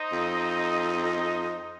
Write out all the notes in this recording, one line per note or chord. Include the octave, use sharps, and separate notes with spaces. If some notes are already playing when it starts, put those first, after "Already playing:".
Already playing: D#4 C5 D#5
F2